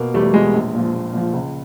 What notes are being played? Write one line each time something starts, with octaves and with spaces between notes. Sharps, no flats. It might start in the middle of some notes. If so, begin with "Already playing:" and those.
Already playing: B2 A#3
E2 G3 A3
B2 G#3
A#1
A#2 F3
A#1
A#2 F3
C#2